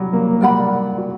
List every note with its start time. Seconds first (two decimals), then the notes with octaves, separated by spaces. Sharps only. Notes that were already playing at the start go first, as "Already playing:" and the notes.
Already playing: F#3 G3
0.13 A#3
0.41 G3 A#4 D5 F#5 B5
0.98 F#4